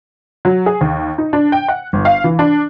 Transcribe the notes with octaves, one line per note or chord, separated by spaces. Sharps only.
F#3
G#4
D#2
D#4
D4
G5
F#5
G1
F5
E3
D4